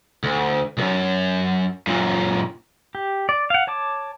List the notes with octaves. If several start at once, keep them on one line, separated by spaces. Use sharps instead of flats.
D2
C#2 F#2
F#2 A#2
G4
D5
F5 F#5
C#5 A5 D6